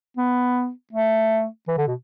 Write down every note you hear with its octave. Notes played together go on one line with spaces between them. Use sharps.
B3
A3
E3
D3
B2